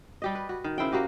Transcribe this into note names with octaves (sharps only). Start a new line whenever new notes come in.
G3 G4 D#5
B4
F#4
D#3
C#3 E4 C5 G5
A#3 F#4 G4 D#5